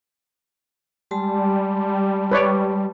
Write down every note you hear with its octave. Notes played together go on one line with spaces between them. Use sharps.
G3 G#3 A5 C6
B4 C#5 D5